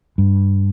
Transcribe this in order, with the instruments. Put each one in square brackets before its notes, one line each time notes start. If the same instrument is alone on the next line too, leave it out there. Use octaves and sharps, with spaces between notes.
[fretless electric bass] G2